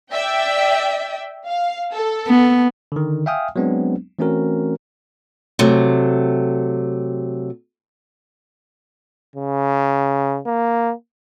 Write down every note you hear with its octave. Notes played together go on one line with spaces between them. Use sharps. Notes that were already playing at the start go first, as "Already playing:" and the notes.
D5 E5 G5
F5
A4
B3
D3 D#3
E5 F5 G5 G#5 D#6 F6
F#3 G#3 B3 C4 D4
E3 A3 C4 C#4 F#4 A#4
C3 F#3 A3
C#3
A#3